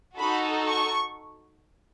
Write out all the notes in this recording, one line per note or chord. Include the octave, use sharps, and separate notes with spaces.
D#4 F#4 A4 B5
C#6